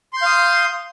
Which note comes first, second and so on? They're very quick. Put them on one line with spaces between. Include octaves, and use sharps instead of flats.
C6 G6 F5 D#6